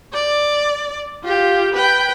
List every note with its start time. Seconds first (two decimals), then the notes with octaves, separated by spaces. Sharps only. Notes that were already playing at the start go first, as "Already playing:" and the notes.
0.13 D5
1.24 F4 G4
1.75 B4 G5